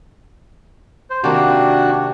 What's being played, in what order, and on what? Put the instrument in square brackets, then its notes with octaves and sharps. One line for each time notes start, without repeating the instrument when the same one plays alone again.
[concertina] C5
[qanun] C3 D#3 A#3 [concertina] D4 F#4